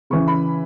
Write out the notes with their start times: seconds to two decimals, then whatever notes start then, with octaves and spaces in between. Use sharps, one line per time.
0.10 C#3 E3 C#6
0.27 B5